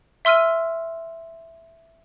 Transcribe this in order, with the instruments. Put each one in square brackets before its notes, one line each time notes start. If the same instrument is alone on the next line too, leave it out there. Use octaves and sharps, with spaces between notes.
[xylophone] E5 C6 E6 F6 D#7